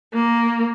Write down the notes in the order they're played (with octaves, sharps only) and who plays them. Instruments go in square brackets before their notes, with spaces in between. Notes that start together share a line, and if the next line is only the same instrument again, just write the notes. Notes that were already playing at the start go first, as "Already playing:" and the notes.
[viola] A#3